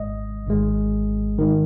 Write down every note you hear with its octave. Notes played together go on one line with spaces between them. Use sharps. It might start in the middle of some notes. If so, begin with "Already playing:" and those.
Already playing: G#1 G#2 G#3 D#5
G#1 G#2 G#3
G#2 D#3